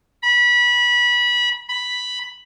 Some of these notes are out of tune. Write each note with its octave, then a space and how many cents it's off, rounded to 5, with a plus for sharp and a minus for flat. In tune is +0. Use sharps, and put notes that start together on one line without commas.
B5 -25
B5 +0